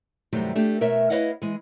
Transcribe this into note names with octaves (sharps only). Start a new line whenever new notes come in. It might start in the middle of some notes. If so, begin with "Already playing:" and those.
G2 C3 D#3 F#3 G3 A3
A3 D4 G4
B2 A3 A#4 C#5 E5
E4 B4 C#5 D#5 F5 F#5
E3 G#3